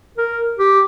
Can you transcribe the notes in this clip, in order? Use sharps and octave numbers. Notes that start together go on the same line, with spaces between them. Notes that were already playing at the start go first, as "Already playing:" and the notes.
A#4
G4